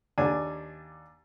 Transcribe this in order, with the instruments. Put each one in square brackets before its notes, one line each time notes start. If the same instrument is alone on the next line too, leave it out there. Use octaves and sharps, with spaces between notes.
[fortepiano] D#2 D4 G#5